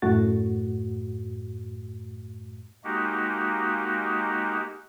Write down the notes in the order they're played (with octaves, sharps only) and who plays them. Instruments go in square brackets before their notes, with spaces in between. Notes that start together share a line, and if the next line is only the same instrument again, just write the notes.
[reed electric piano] F#2 A2 A3 F#4 A6
[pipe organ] G#3 A#3 D#4 F#4 G4